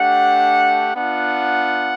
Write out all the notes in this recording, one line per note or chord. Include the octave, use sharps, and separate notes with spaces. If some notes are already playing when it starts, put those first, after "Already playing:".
Already playing: A3 D4 G4 F#5
B3 D4 F4 F#5